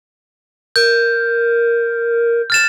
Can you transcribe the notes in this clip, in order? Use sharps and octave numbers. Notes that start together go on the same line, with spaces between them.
A#4 G6
F6 A6 E7